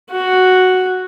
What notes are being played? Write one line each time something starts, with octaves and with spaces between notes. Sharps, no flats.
F#4